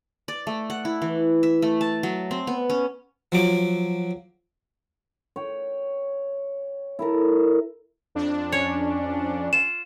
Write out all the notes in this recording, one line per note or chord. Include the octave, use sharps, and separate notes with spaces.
D5
A3
F#5
E4
E3
E5
A3
A5
F#3
C4
B3
C#4
F3 F#3 D6
C#5 G5
E4 A4 A#4
F2 D4
C#4 C#5
F4 E7